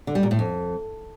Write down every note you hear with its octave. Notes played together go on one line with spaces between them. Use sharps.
D3
G3
A#2
A2
F2